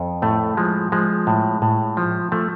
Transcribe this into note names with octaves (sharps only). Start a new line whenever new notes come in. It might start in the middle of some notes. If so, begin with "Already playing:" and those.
Already playing: F2
A2 A3
F3 G#3
F3 G#3
A2
A2
F3
F3 A3